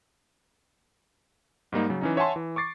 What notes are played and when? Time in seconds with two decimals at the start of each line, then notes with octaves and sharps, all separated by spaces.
1.72 G#2 G3 A#3 D#4
1.89 C#3 F#3
2.01 E3 C#4 D#4
2.17 C#5 E5 F#5 G#5 A5 C6
2.36 E3
2.56 C#6 D6 A6 C7